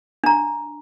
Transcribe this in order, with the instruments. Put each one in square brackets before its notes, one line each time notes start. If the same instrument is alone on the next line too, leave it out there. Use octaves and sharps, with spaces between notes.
[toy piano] D4 A#5